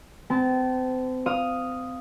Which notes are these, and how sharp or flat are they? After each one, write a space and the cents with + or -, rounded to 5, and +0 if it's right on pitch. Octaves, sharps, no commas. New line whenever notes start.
C4 -35 A5 -20
F5 +0 D#6 +0